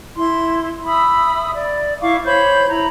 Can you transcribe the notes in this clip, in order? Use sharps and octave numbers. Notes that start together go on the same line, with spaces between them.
E4 C6
E5 B5 D#6 E6
D5
E4 F5 C#6 D6
C5 C#5 B5 G6
E4 A#5 B5